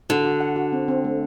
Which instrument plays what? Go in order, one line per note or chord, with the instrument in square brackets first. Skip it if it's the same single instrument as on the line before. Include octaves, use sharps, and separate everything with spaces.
[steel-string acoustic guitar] D3 [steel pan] F#4
[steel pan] F#4
F#5
F#4
C4
C4
A3